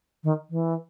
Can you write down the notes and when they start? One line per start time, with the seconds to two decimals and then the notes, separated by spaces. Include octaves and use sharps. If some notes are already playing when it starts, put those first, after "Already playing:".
0.24 D#3
0.50 E3